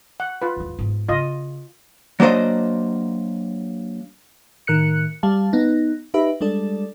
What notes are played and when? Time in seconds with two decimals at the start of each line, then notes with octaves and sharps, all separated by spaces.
0.20 F#5
0.42 F4 B4
0.56 D#2 G#2
0.79 G#2 B3
1.09 C#3 F4 D#5
2.20 F#3 A#3 D4 C5 D#5
4.67 A2 D#3 A#4 F#6 C#7
5.23 G3 F5 A5
5.53 B3 D#4
6.14 D#4 G4 B4 E5
6.41 G3 G#3 D4 A4 D5